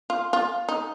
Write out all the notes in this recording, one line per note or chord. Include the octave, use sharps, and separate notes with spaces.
F4
F4
D#4